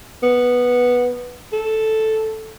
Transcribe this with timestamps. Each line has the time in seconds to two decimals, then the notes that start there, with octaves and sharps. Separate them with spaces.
0.23 B3
1.53 A4